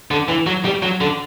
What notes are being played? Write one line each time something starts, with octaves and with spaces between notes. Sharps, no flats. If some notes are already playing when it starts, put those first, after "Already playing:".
D3
E3
F#3
G3
F#3
D3